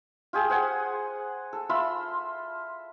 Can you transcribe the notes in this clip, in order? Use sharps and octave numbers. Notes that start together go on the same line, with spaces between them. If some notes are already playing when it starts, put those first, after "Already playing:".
F4 G4 G#4
C5 F#5 G#5
A4
F4 E5 B5 C6